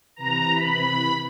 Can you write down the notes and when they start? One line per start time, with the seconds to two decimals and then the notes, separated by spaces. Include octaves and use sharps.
0.16 C3 E3 B4 A#5
0.54 B5